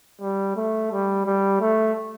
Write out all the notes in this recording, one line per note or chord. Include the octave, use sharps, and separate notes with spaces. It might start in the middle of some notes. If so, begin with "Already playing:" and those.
G3
A3
G3
G3
A3